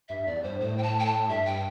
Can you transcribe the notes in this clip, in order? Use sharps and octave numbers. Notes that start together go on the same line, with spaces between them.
G2 E5
G2
E2 D5
G2 C5
A2 C5
G5
A5
G5
A5
G2 E5
G5